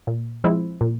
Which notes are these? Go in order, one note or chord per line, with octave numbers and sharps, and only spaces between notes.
A#2
F3 G#3 C4 E4
A#2